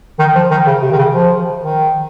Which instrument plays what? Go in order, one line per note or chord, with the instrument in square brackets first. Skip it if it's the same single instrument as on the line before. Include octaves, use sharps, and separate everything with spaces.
[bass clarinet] D#3
F3
D#3
C#3
C3
D#3
C#3
F3
D#3